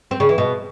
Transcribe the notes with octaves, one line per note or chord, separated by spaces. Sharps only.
C4
C#3
E3
B2